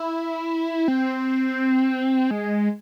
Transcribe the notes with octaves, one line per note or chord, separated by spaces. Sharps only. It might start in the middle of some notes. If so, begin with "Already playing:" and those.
Already playing: E4
C4
G#3